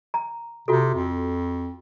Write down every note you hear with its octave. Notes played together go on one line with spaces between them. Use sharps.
A#5
C3 F4 F#4 A4
F2